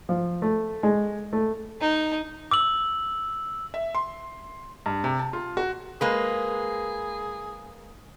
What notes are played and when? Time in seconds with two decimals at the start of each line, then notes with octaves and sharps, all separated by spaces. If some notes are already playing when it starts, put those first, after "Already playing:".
0.09 F3
0.42 A3
0.83 G#3
1.33 A3
1.81 D#4
2.51 D6 E6 F#7
3.74 E5
3.95 C6
4.86 G2
5.04 C3
5.19 A5
5.33 F4
5.57 F#4
6.01 G#3 A#3 G#4 B4